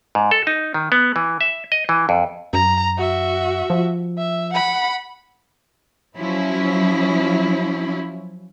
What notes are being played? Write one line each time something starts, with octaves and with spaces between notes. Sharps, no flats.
G#2
A4
D#4
D#3
B3
E3
E5
D#5
E3
F2
F#2 A#5
F#4 E5
F3
E5
F#5 B5
F3 F#3 C#4 E4